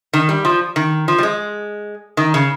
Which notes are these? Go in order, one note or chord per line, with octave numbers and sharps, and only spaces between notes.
D#3
G3
F3
D#3
F3
G3
G#3
D#3
C#3